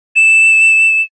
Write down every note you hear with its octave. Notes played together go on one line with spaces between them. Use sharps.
E7